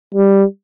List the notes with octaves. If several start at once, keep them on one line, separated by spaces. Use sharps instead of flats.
G3